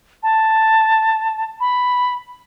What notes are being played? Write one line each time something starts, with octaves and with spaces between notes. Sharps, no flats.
A5
B5